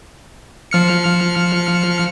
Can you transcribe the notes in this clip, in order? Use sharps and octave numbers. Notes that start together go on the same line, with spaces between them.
F3 F6 C#7